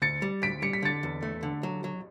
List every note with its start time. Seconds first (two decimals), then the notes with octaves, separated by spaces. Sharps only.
0.02 D2 A6 C#7
0.22 G3
0.42 D2 B6 D7
0.62 G3 C#7
0.73 B6
0.82 D3 A6 C#7
1.03 E2
1.22 A3
1.43 D3
1.63 F#3
1.84 F#3